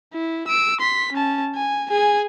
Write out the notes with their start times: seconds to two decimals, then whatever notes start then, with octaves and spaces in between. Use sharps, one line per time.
0.14 E4
0.48 E6 D7
0.80 C6 B6
1.13 C#4 A5
1.55 G#5
1.91 G#4 G#5